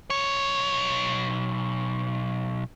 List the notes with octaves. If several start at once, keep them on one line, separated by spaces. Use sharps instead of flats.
B1 C#5